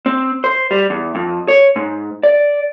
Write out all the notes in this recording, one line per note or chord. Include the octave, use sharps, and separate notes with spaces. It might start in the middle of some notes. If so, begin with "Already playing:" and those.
C4
C5
G3
E2
F2
C#5
G#2
D5